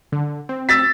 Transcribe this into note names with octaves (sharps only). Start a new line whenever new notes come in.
D3
C4
E6 A6 B6